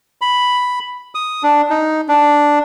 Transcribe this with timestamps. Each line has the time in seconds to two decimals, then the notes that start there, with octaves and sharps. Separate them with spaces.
0.21 B5
1.15 D#6
1.43 D4
1.70 D#4
2.09 D4